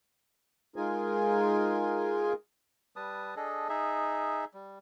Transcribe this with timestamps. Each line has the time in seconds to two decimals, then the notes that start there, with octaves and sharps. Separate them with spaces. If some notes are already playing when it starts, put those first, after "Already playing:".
0.76 G#3 D#4 F4 G#4 A#4 G#5
2.96 G3 B4 A5 D#6
3.36 D4 G#4 A4 D#5
3.69 D#4 G#4 E5
4.54 G3